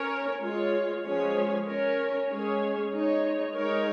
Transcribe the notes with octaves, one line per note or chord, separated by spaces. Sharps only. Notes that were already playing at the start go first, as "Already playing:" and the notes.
Already playing: C#4 A#4 C#5
G#3 F4 C#5
F3 G#3 C#4 G#4 C#5
C#4 A#4 C#5
G#3 C#4 G#4 C#5
G#3 D#4 C#5
G#3 D#4 A#4 C#5